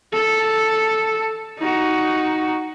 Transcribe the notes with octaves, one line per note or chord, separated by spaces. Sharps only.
A4
D#4 F#4